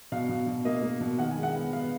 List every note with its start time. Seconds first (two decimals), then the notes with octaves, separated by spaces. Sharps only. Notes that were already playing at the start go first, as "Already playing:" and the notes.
0.12 B2 F5
0.29 B2
0.47 B2
0.65 A#3 D#5
0.83 A#3
1.01 B2
1.19 D#3 F#5
1.31 G#5
1.36 G#3
1.43 F#5
1.54 B3
1.72 B3 F5